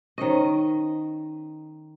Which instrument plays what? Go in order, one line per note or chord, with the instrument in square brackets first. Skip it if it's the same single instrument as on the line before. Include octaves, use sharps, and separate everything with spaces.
[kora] D#3 D#5 [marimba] C#4 C5 C#5